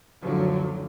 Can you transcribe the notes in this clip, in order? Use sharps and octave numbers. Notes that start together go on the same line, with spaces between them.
F#1 D2 D3 F3 F#3